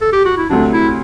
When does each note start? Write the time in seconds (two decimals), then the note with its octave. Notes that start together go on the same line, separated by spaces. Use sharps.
0.01 A4
0.13 G4
0.25 F#4
0.38 E4
0.50 D2 C3 F#3 D4
0.73 E4